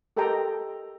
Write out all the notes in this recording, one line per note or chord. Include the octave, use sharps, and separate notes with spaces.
G4 A4 A#4 D#5 G5 A#5